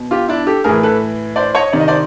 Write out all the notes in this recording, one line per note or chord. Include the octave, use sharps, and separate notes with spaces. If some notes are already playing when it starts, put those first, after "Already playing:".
Already playing: B2
F4 G4
D4 E4
G4 A4
A2 E3 G#4 A#4
A4 B4
C5 D5
C#5 D#5
C3 D#3 D5
D#5
C5 D5